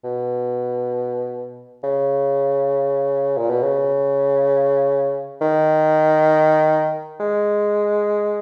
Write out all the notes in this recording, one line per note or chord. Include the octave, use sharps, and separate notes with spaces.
B2
C#3
A#2
B2
C#3
D#3
G#3